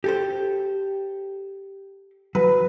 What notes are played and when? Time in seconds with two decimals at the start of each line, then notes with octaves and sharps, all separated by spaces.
0.04 G4 A4 C5
2.35 F#3 B4